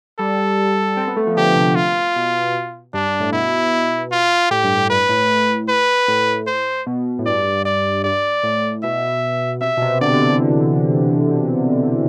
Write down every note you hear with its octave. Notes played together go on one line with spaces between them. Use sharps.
G3 A4
C4
B3
A3
F3
D3 G4
C3
F4
B2
G2 D4
G2
A2
B2 E4
F4
A2 G4
G2
A2
G2 B4
A2
B4
A2
C5
B2
A2
G2 D5
D5
G2 D5
A2
B2 E5
C3 E5
B2
C3
D3 D5
D3
E3